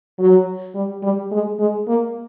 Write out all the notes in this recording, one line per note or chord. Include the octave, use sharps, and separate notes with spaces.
F#3
G3
G3
G#3
G#3
A#3